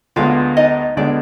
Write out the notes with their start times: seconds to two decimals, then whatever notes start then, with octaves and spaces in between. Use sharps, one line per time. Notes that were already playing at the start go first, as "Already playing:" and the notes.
0.16 D2 D3 G#3 B3 F4 F5
0.57 D#4 D#5
0.97 D2 D3 G#3 B3 D4 D5